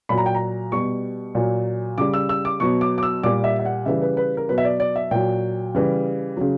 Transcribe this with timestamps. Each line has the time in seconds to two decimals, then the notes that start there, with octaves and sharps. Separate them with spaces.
0.09 A#2 F#3 B5
0.18 A#5
0.26 G5
0.35 A#5
0.72 B2 G3 C#6
1.35 A#2 F#3
1.98 C#3 G3 D6
2.14 E6
2.29 E6
2.45 D6
2.60 B2 F#3 C#6
2.81 D6
2.98 D6
3.03 E6
3.23 A#2 G3 D6
3.44 E5
3.59 E5
3.65 F#5
3.86 C#3 E3 G3 E5
4.02 B4
4.17 B4
4.37 A#4
4.49 B2 F#3 B4
4.58 E5
4.65 D5
4.80 D5
4.96 E5
5.11 A#2 F#3 G5
5.75 C#3 E3 G3
6.37 C#3 F#3